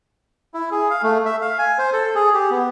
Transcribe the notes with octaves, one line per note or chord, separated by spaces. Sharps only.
E4
G#4
F5
A3
E5
F5
G#5
C5
A4
G#4
G4
B3